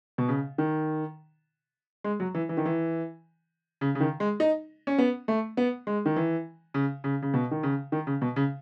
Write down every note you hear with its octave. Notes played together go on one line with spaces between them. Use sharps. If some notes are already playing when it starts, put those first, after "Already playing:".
B2
C#3
D#3
G#3
F#3
E3
E3
D#3
E3
C#3
C#3
D#3
G#3
D#4
C#4
B3
A3
B3
G#3
D#3
E3
C#3
C#3
C#3
B2
D#3
C#3
D#3
C#3
B2
C#3